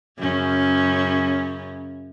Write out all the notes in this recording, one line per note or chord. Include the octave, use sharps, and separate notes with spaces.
F#2 C#3 C#4